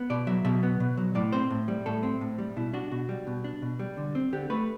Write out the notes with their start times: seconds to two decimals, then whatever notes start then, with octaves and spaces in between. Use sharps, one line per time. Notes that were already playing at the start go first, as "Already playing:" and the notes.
Already playing: B3
0.10 B2 D5
0.27 F#3 E5
0.45 B2 E5
0.63 B3
0.80 B2
0.97 F#3
1.15 A2 D5
1.33 C4 C5
1.50 A2
1.68 G3
1.86 A2 A4
2.03 C4
2.21 A2
2.38 G3
2.56 B2 E4
2.74 D4 F#4
2.92 B2 F#4
3.09 G3
3.27 B2
3.44 D4
3.62 B2
3.79 G3
3.97 D3
4.15 C4
4.33 D3 G4
4.50 A3 B4